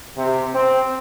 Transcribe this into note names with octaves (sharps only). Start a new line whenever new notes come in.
C3
C4